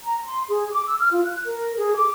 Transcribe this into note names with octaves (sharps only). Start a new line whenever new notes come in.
A#5
C6
G#4
D6
E6
F6
F4
F#6
A#4
G#4
D6